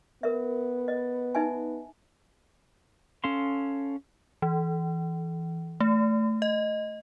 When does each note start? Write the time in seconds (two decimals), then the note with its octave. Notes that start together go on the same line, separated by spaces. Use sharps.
0.23 B3 A#4 E5
0.88 D#5
1.35 D#4 E5 G#5
3.24 C#4 A4 F5 C6
4.42 E3
5.80 A3
6.42 D#5